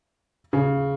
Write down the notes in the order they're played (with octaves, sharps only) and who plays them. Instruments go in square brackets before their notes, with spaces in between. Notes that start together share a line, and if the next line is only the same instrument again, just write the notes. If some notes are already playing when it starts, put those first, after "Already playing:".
[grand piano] C#3